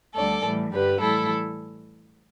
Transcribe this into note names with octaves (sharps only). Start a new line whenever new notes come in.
D2 D3 G3 A4 D5
A2 E3 G3
G2 D3 G3 G4 B4
A2 E3 G3 E4 A4